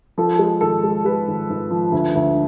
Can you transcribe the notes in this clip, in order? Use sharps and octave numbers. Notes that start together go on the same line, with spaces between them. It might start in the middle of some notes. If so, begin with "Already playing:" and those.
F3 A4
G#3
G#1 A4
G#3
G#3 B4
G#1
G#1
F3
D2
D2